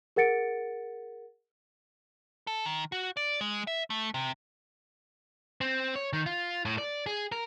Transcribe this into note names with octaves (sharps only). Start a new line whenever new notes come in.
G#4 A#4 F#5 A6 C#7 D7
A4
D#3
F#4
D5
G#3
E5
A3
C3
C4
C#5
D#3
F4
A2
D5
G#4
A#4